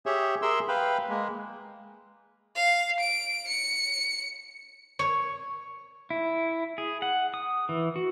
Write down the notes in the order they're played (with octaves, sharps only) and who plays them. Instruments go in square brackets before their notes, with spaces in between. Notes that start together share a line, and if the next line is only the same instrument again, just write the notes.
[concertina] G4 G#4 C#5 E5
G#4 A#4 E5 C6 E6
B4 F5 G5 B5
G#3 A#3
[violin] F5
D7
C#7
[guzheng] C#5
[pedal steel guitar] E4
G#4
F#5
D#6
E3
F#4